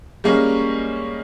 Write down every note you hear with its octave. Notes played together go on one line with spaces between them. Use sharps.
G3 G#3 A#3 C#4 G#4